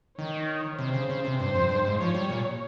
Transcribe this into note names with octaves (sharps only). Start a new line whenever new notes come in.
D#3 C#5
C3 C5
C#3
C#3
C3
G2 C5
F2
G2
G#2
F3 C#5
G3
A#2